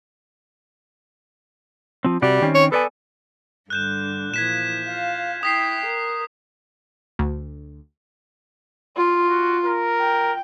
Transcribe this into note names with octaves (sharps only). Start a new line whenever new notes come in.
F3 C4
C3 G3 F#4 D5
D#3 C4 C#4
C#5
B3 A4 D5 G#5
G2 D3 F#6 G6 E7
A#2 E3 F3 G#6 B6 E7
F4 F5
E4 G5 D#6 B6 C7
A#4
D2
F4
F#4
A#4
G5